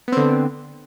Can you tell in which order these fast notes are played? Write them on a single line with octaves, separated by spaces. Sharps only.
B3 C4 D3